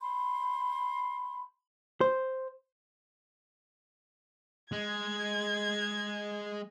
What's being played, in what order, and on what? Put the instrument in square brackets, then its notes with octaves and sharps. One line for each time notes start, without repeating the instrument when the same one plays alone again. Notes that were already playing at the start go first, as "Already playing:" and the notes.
[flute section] B5 C6
[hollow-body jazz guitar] C5
[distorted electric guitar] G#3 [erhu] G#6